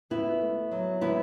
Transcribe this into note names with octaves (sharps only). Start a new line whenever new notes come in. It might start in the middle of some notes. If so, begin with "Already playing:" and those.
D2 B3 E4
A3
F#3
D3 B3 E4